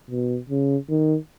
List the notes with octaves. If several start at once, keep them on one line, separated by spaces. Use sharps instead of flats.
B2
C#3
D#3